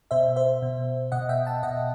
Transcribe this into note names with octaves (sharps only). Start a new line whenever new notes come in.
B2 C5 E5
C5 E5
B2
B2 D#5 F#5
E5 G5
F#5 A5
B2 D#5 F#5